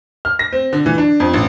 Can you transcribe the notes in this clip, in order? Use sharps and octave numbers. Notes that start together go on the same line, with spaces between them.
F6
A#6
C4
D3
E3
D4
F2
A1